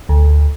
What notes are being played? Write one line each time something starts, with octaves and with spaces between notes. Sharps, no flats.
D2